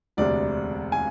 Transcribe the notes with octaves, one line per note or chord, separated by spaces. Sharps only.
E1 D2 C3 D5
G#5